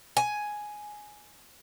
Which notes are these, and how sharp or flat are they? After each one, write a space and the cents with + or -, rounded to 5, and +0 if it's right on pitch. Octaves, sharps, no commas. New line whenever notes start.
G#5 +5